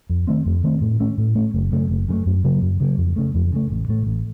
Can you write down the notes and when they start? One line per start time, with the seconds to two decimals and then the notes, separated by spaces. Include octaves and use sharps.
0.10 F2
0.27 D#3 A3 C4
0.46 F2
0.64 D#3 A3 C4
0.81 A2
1.00 A3 C#4
1.18 A2
1.35 A3 C#4
1.54 F#1
1.72 F#2 C#3 A3
1.89 F#1
2.08 F#2 C#3
2.13 A3
2.26 F#2
2.44 C#3 F#3 A#3
2.62 F#2
2.80 C#3 F#3 A#3
2.98 F2
3.16 C#3 A3
3.35 F2
3.52 C#3 A3
3.70 A1
3.88 A2 A3
4.07 A1